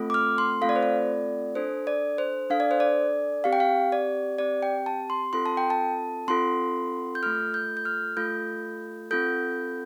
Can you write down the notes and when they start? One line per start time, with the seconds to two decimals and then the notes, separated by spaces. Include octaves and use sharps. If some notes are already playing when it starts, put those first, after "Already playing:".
Already playing: A3 C4 F4 A4
0.10 D6
0.14 F6
0.38 C6
0.61 A3 C4 F4 A4 F5
0.69 D5
0.76 C5
0.83 D5
1.55 D4 A4 C5
1.87 D5
2.18 C5
2.50 D4 A4 F5
2.60 D5
2.71 C5
2.80 D5
3.44 C4 G4 F5
3.53 G5
3.60 F5
3.92 D5
4.38 C4 G4 D5
4.63 G5
4.86 A5
5.10 C6
5.33 C4 F4 A4 C6
5.46 A5
5.57 G5
5.70 A5
6.28 C4 F4 A4 C6
7.15 G6
7.22 A3 F4 A4 F6
7.54 G6
7.77 G6
7.85 F6
8.17 A3 F4 A4 G6
9.11 C4 F4 A4 G6